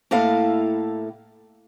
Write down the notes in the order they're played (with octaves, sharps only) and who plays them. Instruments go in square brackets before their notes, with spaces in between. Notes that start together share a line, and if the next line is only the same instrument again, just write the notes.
[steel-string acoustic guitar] A2 A#3 E4 A4 F5